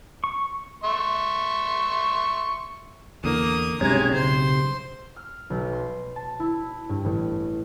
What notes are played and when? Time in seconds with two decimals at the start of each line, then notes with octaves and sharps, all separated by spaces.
0.24 C#6
0.84 E5 C6 C#6
3.24 E2 D3 A#3 D#6
3.81 B1 G2 C3 G#3 C#4 C#5 A#5 G#6
4.14 C#3 C5 C6
5.16 F6
5.50 B1
5.73 C6
6.16 A5
6.40 E4
6.89 G2
7.04 A1